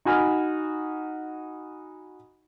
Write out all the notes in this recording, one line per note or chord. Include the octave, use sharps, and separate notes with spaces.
D#4 F#4 G#5 B5 F6